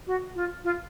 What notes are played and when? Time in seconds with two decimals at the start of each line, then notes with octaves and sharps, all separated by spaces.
0.07 F#4
0.35 F4
0.64 F4